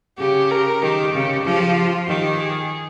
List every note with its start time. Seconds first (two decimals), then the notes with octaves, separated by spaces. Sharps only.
0.18 C#3 G4
0.51 A#4
0.82 D#3 G4
1.12 C#3
1.45 F3 G4
1.75 F4
2.07 D#3 G4
2.39 G#4